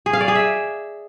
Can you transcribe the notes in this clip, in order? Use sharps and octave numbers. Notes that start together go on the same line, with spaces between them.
G#4
F5
D5
G#4
E5